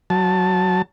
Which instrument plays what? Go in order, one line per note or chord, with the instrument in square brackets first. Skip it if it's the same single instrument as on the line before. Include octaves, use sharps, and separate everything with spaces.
[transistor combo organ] F#3 A5